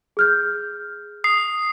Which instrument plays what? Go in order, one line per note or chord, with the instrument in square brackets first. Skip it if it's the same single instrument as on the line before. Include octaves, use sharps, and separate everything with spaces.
[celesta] G#4 F6 G6
[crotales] D#6 C7